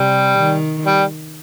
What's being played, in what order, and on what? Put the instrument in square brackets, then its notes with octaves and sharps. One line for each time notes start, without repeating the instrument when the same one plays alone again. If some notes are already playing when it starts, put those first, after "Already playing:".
Already playing: [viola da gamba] C3 [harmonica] G3
[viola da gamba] D#3
[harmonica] G3